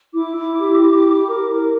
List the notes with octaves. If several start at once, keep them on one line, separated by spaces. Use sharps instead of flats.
E4 D6
E4
G4
G4
E4
A#4
A#4